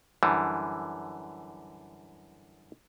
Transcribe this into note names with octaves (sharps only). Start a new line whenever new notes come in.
F#2 D3 E3 G3